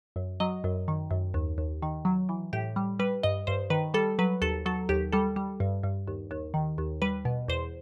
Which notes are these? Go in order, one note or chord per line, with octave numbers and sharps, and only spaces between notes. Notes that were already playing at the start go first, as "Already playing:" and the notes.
F#2
F#3 D#5
F#2
D#3
F#2
D#2
D#2
D#3
F#3
E3
A2 G4
G3
G3 B4
G2 D#5
G2 C5
D#3 B4
G3 A4
F#3 B4
D#2 A4
F#3 A4
D#2 G4
G3 A4
G3
G2
G2
D#2
D#2
D#3
D#2
G3 B4
B2
E2 C5